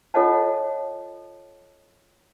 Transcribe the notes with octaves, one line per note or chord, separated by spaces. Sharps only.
F4 A4 C#5 D#5 F#5 A5